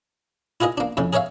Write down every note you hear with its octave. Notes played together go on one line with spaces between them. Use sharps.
E4 F4 G#4 A#4 D#5
A#3 D4
F2 A2 C#3
G#4 A#4 C#5 E5 F5